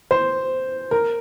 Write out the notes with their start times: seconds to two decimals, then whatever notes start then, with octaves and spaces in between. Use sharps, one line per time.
0.11 C5
0.91 A#4